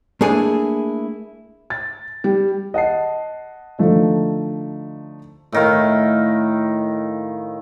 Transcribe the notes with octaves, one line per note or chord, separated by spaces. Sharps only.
A3 A#3 D4 E4 G#4
A6
G3
D#5 F#5 A5 C7
D3 F3 A3 D#4
A2 D#3 F5